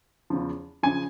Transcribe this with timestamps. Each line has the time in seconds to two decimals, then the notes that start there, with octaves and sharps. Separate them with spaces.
0.30 E2 C#3 F3
0.83 C#3 F3 G#5